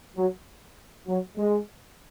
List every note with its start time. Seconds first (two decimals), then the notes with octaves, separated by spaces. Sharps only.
0.16 F#3
1.06 F#3
1.37 G#3